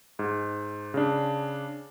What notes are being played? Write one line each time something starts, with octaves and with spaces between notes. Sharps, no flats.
G#2
C#3 D4